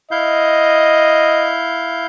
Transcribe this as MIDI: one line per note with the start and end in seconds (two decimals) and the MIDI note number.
0.11 2.07 64
0.11 1.56 75
0.11 2.07 77
0.11 2.07 91